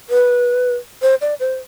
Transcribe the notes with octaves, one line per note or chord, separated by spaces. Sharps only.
B4
C5
D5
C5